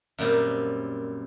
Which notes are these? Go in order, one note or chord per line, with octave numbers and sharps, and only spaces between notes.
F#2 A#2 G3 C4